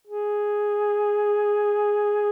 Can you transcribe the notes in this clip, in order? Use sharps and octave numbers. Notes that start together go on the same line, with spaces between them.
G#4